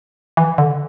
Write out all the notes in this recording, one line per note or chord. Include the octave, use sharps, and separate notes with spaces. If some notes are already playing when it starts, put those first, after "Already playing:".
E3
D3